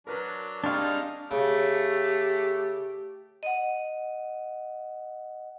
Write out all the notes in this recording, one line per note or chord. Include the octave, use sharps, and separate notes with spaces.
F#3 D4 A#4 B4
G3 G#3 C4 D4 D#4 F5 C#6
C#3 A3 G4
D#5 F#5